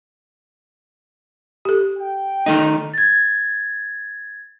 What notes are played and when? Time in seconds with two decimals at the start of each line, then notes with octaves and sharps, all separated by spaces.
1.65 G4 A4
1.99 G5
2.46 D#3 A3 D#4
2.94 G#6 A6